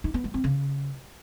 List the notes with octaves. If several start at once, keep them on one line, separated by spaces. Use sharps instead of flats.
D#4
B3
G#3
C4
C#3